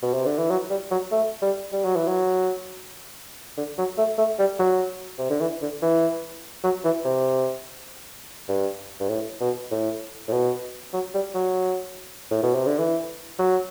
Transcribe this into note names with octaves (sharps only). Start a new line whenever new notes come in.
B2
C3
D3
E3
F#3
G3
F#3
A3
G3
G3
F#3
E3
F#3
D3
F#3
A3
A3
G3
F#3
C3
D3
E3
D3
E3
F#3
E3
C3
G2
G2
A2
B2
A2
A2
B2
F#3
G3
F#3
A2
B2
C3
D3
E3
F#3